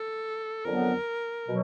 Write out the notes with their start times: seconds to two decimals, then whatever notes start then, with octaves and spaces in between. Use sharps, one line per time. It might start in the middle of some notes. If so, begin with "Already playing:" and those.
Already playing: A4
0.65 F2 D3 F#3 B3 A#4
1.47 B2 F#3